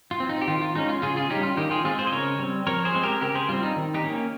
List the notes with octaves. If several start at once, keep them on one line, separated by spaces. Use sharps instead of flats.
F4
C4
D#4
G4
D#3 F4
F4
G#3 C#4 D#4
F4
C#3 F4 G#4
F4 G#4
G3 C#4 D#4 G4
F4
D#3 D#4 G4
F4 G#4
G#3 C4 F4 G#4
G#4 C5
D#5
C#3 A#4 C#5
G3 C4
F3 A#4 C#5
G#4 C5
G#3 C4
G4 A#4
C#3 G4 A#4
G#4 C5
G3 C4 F4
D#4
D#3
D#4 G4
A#3 C#4